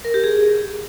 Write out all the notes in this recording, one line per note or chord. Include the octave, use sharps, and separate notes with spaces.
A#4
G4
G#4